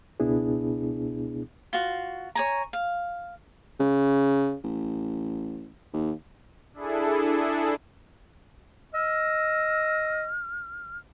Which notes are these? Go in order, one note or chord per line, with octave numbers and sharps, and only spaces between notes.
C#2 B2 B3 D4 E4 G#4
F4 F#4
C#5 G#5 A#5
F5
C#3
A1
D#2
D4 E4 G#4 A4
D#5 E6 F6